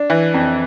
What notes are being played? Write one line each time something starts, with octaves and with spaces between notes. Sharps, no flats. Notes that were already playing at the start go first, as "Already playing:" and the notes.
Already playing: D4
E3
F2